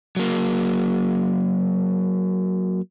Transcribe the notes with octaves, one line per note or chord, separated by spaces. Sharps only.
F#3 A#3